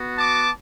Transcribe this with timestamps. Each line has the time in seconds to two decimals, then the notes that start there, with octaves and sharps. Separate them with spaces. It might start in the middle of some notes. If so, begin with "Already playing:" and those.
Already playing: B3 F#4
0.18 A5 D6